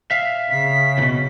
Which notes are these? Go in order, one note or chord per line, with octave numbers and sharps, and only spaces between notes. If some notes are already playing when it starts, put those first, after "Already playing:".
E5 F5
C#3 B6
E2 B2